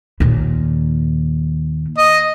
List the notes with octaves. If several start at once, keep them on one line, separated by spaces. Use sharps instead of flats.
D#2 A#2
D#5